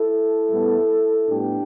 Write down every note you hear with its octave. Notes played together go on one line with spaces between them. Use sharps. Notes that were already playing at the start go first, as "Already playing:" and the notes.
Already playing: E4 A4
A2 G3 B3
A2 G3 B3 D4 G4